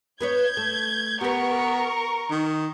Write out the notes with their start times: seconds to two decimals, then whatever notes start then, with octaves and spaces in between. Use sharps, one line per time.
0.21 B3 B4 C#5 G6 G#6
0.57 A3
1.21 B3 G4 A#4 B4 C#6
2.31 D#3